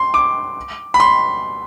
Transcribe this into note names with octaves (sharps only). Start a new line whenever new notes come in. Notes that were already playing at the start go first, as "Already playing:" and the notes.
Already playing: C6
D6
B5
C6